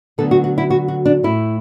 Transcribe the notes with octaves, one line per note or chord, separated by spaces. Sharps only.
D2 D3 F#3 B3 A4
F#4
F#4
E4
F#4
F#4
D4
A2 A3 E4